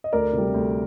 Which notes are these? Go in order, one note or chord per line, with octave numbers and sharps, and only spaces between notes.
D#5
D2 A#4 D5
C3
G3
D2